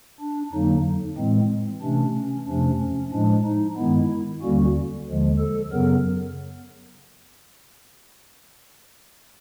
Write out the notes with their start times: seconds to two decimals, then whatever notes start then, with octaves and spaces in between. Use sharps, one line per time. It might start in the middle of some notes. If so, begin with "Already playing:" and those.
0.20 D4
0.53 F2 D3 F#3 A#3 D#4
1.18 A2 E3 G#3 C4
1.82 C3 E3 A3 C#4 D4
2.15 C#4
2.47 F2 C3 F3 A3 C#4 D4
2.80 C#4
3.12 A2 F3 G#3 D4
3.45 D#4
3.77 G2 D#3 G#3 B3 E4
4.42 D#2 D3 G3 A#3 C#4 F#4
5.07 D#2 D3 F3 G#3
5.39 A4
5.72 F#2 C#3 F#3 B3 A#4